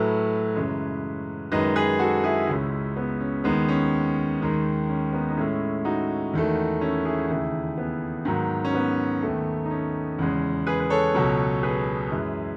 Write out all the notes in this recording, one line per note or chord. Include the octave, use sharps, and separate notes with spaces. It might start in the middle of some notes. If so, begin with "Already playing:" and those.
Already playing: A2 F#3 A3 B4
F#2 C#3 E3 G#3
F#2 D#3 G#3 B4 D#5
G#4 B4
F#4 A4
E4 G#4
C#2 C#3 G#3 C#4 E4
B3
C#4
D#2 D#3 G#3 B3
C#4
D#2 D#3 G#3
C#4
B3 D#4
D#4
A2 G#3 C#4 E4
D#4 F#4
E2 D#3 A3
C#4 E4
E4 G#4
D#2 C#3 E3 A3
B3
G#2 D#3 F#3
C#4
B3
D#2 D#3 A3
D#4
C#4
E2 C#3 G#3
G#4 B4
B4
A4 C#5
C#2 B2 F#3
G#4 B4
F#2 E3 G#3